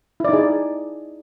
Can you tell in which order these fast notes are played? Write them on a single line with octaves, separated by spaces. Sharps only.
E4 D5 D#4 G#4